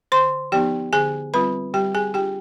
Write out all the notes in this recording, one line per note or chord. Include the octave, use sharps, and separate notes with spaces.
D3 C5 C6
F3 B3 D#4 G4 G5
D3 G#4 G#5
G3 C4 F4 B4 B5
G3 G4 G5
G#4 G#5
D4 F4 G4 G5